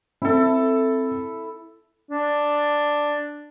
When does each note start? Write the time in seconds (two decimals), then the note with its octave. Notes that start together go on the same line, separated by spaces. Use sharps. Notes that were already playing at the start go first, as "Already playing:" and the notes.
0.22 C4 E4 A4
2.10 D4